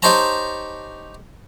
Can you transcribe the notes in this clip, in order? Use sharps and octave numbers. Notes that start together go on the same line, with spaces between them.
D#4 G4 C5 C#5 A5 A#5